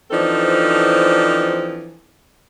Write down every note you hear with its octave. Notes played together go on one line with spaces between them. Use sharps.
E3 F3 C4 D4 D#4 A4